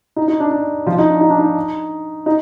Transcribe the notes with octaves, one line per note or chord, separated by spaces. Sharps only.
D#4
D#4
D4
D4
F3 F4
D#4
D4
D#4
D4
D#4
D#4